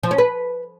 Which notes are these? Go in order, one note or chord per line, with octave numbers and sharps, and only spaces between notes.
F3
C#4
B4